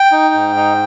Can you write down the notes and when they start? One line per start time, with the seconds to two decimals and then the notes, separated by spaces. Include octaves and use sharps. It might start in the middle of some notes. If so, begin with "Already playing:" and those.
Already playing: G5
0.12 D#4
0.34 G#2
0.56 D#4